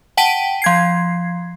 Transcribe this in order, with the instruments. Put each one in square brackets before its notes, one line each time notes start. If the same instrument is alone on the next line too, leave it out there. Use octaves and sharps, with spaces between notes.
[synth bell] F#5 G5 A5 B6 D7 D#7
F3 G#6 C7